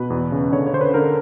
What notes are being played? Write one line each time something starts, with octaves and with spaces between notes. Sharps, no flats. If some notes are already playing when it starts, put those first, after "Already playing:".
Already playing: B2 B4
E2
C#3
D3 C#5
C#5
D3 C5
B4
D3 A#4